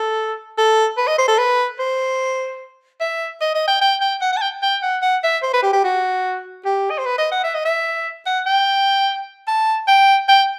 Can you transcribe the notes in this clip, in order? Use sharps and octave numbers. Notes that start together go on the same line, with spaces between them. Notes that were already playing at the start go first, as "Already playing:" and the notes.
Already playing: A4
A4
B4
D#5
C5
A4
B4
C5
E5
D#5
D#5
G5
G5
G5
F#5
F#5
A5
G5
G5
F#5
F#5
E5
C5
B4
G4
G4
F#4
G4
D#5
C5
B4
D#5
F#5
E5
D#5
E5
F#5
G5
A5
G5
G5